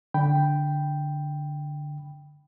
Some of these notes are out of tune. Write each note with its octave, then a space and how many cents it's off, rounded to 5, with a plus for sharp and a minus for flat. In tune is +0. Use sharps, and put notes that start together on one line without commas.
D3 +0 G5 +0 B5 +0